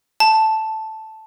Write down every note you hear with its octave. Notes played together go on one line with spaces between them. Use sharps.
A5